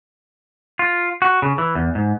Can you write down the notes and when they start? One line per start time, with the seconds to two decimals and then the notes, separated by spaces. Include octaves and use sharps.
0.79 F4
1.22 F#4
1.42 C#3
1.58 E3
1.75 E2
1.95 G#2